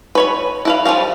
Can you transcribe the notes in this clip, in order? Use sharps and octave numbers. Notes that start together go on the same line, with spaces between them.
B4 C#5 B5
E4 B4 F5
F3 G3 G#4 F5